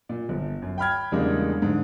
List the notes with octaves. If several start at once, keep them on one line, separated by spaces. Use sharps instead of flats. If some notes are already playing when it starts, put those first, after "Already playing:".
A#2
G1
F#2
G5 B5 F6 G#6
E2 C#3 G3 G#3 A#3 D4
G#2 D3